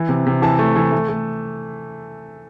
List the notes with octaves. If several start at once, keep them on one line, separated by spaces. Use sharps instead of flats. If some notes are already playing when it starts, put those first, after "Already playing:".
Already playing: E3
C3
C3
E3 A5
A3
E3
A3
A3